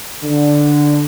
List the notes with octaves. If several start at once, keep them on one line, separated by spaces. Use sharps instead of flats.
D3